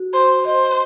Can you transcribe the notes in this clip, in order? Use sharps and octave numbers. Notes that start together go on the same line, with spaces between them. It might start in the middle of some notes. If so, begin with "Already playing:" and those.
Already playing: F#4
C5
C5 D#5